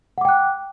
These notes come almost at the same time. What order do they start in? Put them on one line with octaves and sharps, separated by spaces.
F#5 D6 G5 F#6